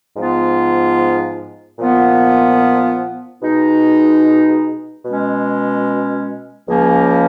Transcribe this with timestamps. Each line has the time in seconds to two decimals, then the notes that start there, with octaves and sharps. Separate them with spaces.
0.16 G#2 F3 B3 F4
1.79 A#2 F3 B3 F4
3.42 B2 G#3 D#4
5.04 B2 G#3 C#4
6.68 C#2 C#3 F3 A#3 C#4